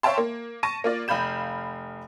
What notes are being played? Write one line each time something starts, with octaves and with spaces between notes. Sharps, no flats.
C#5 E5 F5 G5 A5 C6
A#3
A5 C#6 A#6 D#7
A#3 F4 D5
F1 F5 B5 G6 E7